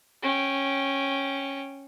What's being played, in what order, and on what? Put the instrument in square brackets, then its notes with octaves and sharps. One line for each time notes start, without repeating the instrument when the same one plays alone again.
[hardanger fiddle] C#4 G5